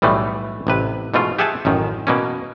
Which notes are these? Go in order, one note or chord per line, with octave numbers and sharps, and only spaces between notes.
B1 A2 E3 G3 A3
A1 C3 B4
G#2 B2 A3 F4
G4 G#4 E5 F#5 G#5 A5
A1 F#2 D#3
B2 A#3 C#4